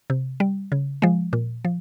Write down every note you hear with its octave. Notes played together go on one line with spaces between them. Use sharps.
C3
G3
C#3
F3 G#3
A#2
F3